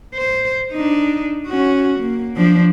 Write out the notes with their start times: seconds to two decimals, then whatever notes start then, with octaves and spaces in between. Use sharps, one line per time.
0.15 C5
0.73 D4 D#4
1.47 C#4 F#4
2.00 A#3
2.36 F3 D4